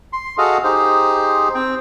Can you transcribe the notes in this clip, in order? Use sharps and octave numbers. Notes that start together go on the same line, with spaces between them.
C6
F#4 G#4 A4 D#5 F5
D#4 G4 G#4 C5
C4 G5